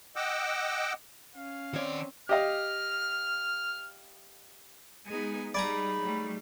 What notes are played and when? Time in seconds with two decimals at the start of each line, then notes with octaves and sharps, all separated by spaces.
0.16 D#5 F#5 G5 D6 E6
1.35 C#4 F5
1.73 D#3 C4 C#5 D5
2.29 G4 D#5 F5 F6
5.07 G#3 B3 D#4 G#4 G#5
5.54 G3 D#4 G#4 D5 G#5 A#5 B5
6.00 F#3 G3 A3